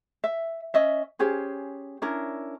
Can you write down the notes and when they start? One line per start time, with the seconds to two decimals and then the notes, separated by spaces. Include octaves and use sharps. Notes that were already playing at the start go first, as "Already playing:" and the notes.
0.24 E5
0.74 C#4 D#5 E5
1.19 C#4 G4 G#4 C5
2.02 C#4 D4 E4 A#4